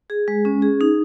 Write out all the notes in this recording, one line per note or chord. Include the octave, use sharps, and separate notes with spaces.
G#4
G#3
C#4
G#4
D#4